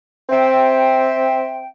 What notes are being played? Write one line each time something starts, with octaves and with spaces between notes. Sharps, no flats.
C4 E5 G5